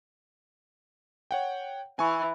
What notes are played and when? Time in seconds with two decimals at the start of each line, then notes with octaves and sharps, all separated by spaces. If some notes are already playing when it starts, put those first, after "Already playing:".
1.31 C#5 F#5 G5
1.99 E3 G#5 C#6